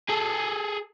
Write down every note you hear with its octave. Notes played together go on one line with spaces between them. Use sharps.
G#4 A4